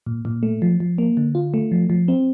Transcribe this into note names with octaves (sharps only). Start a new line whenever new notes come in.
A#2
A#2
A3
F3
F3
A#3
D3
F4
A3
F3
F3
C4